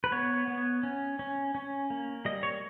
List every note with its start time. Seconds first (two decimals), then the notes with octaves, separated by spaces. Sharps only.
0.04 B4
0.12 B3 C#5
0.48 B3
0.83 C#4
1.19 C#4
1.55 C#4
1.90 A#3
2.25 G3 D#5
2.43 C#5